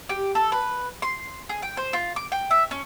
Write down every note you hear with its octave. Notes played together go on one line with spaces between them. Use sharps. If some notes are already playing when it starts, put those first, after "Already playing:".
G4
A4
B4
C6
G#4
G5
C5
F4
D6
G5
E5
C#4